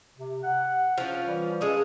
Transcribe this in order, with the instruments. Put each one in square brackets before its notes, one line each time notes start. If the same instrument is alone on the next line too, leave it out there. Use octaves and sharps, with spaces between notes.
[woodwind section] C3
F#5
[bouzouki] F3 C#4
[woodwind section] E3 G3
[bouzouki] G#3 A3 [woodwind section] C#4 A4 D#6